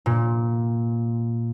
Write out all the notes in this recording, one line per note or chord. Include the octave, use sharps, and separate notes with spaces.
A#2